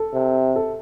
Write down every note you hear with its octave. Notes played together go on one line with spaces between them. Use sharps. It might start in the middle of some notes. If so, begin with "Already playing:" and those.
Already playing: A4
C3
A4